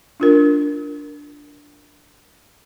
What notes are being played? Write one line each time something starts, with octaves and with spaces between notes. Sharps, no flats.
D4 F4 A#4